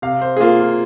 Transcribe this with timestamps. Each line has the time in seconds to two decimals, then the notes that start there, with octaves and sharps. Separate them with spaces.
0.02 C3 F5
0.21 C5
0.37 G#4
0.40 A#3 F4
0.59 F4